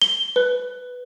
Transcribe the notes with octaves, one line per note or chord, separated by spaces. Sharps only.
G7
B4